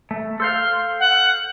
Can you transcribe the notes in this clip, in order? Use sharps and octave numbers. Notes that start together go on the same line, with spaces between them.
A3
A4 C5 F5 C6
F#5